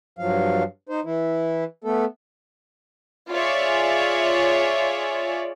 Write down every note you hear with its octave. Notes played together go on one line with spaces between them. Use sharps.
G2 F3 F#3 F5
D#4 C5
E3 E4
A3 B3 A4
F4 G#4 C#5 D5 E5